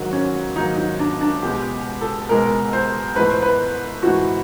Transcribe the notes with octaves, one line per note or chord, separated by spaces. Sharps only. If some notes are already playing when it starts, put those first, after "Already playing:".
Already playing: G#2 D#3 F#3 A#3 F#4
C#4
G#2 D#3 F#3 A#3 D#4
D#4
D4
D4
C#2 B2 G#3 G4
A4
C#2 B2 G#3 A#4
C5
G#2 E3 A3 B4
C5
B4
G#2 E3 A3 F#4